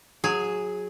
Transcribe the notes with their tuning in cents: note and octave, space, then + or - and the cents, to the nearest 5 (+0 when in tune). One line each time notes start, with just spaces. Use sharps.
F#3 -15 G#4 +0